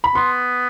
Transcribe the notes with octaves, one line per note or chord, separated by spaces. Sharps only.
B5
B3 C6